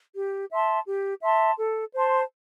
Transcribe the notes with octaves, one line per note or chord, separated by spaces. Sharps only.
G4
E5 A5 C6
G4
E5 A5 C6
A4
C5 A5 C6